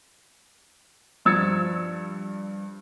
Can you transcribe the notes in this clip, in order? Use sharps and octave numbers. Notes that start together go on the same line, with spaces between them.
G2 F3 E6 G#6 A6 C#7